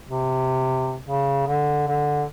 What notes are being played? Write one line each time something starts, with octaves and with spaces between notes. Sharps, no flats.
C3
C#3
D3
D3